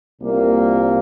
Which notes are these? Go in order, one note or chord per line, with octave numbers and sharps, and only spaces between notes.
C2 A#2 A#3